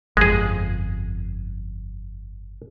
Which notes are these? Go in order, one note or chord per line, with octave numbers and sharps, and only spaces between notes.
G1 F2 G#3 G#4